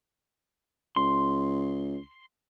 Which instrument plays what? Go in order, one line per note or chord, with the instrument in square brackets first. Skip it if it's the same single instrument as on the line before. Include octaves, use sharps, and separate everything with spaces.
[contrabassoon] C#2 [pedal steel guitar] C6